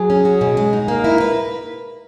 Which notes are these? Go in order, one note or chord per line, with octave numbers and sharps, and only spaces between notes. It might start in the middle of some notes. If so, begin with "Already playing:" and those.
Already playing: F#3 G#4
C#4
F#4
B2
G#3
D#4
A#3 A#4
E4
B4